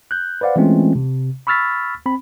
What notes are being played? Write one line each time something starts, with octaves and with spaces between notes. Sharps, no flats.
F#6 G6
B4 C5 D5 F5 F#5
E3 G#3 A3 C4 C#4 F4
C3
B5 C#6 E6 F6 A6 B6
C4 B5